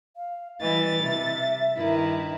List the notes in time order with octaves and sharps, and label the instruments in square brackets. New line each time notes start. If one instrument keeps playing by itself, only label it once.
[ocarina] F5
[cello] E3 G3 [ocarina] D#5 [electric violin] A6
[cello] C3 [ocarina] E5
[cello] G2 D#3 [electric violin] E4